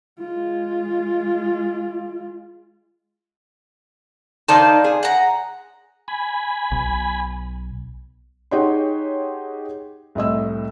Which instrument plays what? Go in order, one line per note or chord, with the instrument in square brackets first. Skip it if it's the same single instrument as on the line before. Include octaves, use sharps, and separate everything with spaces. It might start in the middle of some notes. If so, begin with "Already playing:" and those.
[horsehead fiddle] G#3 F4
[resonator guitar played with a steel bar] D#3 D#4 A5 [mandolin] C5 D5 F5
[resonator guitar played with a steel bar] G#4
[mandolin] F#5 A#5
[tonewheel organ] G#5 B5
[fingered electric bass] B1
[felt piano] D#4 G4 G#4 C#5 F#5 C6
C2 A2 D#5 E6